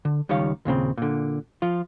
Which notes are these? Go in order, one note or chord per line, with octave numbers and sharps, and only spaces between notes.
D3
C#2 D#3 G3 C#5 F5
D#2 A#2 C#3 C4
A#2 D3
F3 F4